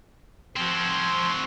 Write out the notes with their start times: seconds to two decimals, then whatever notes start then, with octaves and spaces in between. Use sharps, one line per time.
0.56 F3 C4 F#4 C6 G#6